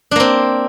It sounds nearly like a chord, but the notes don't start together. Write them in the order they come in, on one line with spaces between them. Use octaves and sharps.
D4 A#3 C4